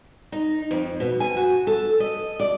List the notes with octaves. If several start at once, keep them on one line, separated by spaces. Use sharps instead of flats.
D#4
F2
B2
G#5
F#4
A4
D#5
D5